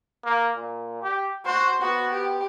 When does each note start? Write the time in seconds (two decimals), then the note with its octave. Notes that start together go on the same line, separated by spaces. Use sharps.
0.24 A#3
0.56 A#2
1.02 G4
1.45 F#4 C5
1.82 B3 F#4
2.11 G4